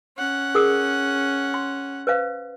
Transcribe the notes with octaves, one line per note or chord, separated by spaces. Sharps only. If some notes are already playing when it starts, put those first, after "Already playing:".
C#4 F#5
G#4 A#4 D#6
C6
B4 C5 F5